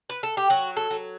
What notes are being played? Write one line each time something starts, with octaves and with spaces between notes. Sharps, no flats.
B4
A4
G4
F#3 F#4
A4
F#3